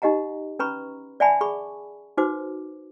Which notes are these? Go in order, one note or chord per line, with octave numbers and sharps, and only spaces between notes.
D#4 G4 D#5 F#5 A#5
C#4 B4 A#5 B5 C#6
D5 E5 F#5 G#5 A5 B5
G#4 B5 C#6
D#4 F#4 B4 C5 D6